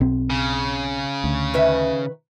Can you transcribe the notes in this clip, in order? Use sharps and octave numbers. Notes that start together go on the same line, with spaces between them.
B1 C4
C#3
D2
D#3 B4 E5